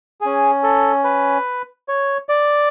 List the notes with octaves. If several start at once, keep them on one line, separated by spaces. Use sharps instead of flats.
C#4 G#4
A4
B4
C#5
D5